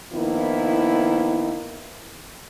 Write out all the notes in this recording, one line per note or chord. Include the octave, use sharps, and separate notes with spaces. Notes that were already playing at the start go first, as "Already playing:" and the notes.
D#3 F3 A#3 B3 E4